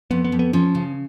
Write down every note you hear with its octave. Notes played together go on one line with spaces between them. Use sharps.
F2 B3
B3
F2
B3
F3 C#4
C#3